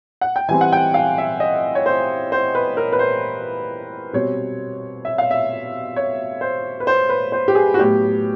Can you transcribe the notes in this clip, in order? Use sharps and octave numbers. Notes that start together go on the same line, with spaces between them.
F#5
G5
E3 G3 C4 G#5
F#5
G5
F5
E5
D#5
C#5
C5
C5
B4
A#4
B4
C5
B2 G3 C4 C#5
E5
F5
E5
C#5
C5
B4
C5
B4
C5
G4
G#4
F#4
A2 F#3 B3 G4